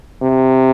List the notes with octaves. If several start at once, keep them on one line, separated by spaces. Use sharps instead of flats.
C3